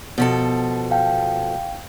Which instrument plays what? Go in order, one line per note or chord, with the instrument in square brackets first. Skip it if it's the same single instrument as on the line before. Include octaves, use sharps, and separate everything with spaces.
[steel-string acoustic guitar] B2 F3 A4
[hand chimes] F5 G5